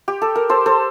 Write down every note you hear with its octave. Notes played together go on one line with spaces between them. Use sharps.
G4
A4
A#4
A4 C5
A4 C5